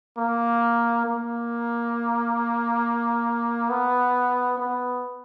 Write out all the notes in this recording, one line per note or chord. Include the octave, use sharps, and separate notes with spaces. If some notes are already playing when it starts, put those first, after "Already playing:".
A#3
A#3
B3
B3